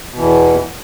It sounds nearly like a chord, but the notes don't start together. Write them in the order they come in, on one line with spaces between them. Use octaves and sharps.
B2 E3 E2